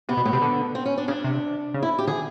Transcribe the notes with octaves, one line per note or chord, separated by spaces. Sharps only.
C3 B3
B2
A2 B3
C3
D3
C4
C#4
D4
C#3 D4
C3
C#3
E4
G4
D3 G#4